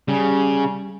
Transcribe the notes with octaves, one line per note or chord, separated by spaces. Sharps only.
C#3 G3